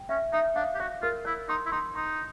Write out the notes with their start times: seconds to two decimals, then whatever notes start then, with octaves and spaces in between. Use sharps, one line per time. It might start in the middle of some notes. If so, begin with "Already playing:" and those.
Already playing: G5
0.09 C#4 E5
0.33 D#4 E5
0.56 D4 F5
0.75 G4
0.79 F#4 C#5
1.02 F4 A#4
1.25 E4 C#5
1.49 D#4 C6
1.66 E4
1.72 D#4 C6
1.95 D#4 C6